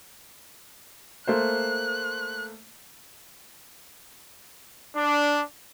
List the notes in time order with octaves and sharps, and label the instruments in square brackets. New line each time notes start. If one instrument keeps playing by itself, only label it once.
[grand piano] A3 A#3 C5 [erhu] F#6
[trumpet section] D4